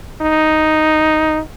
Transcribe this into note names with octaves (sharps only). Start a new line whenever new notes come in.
D#4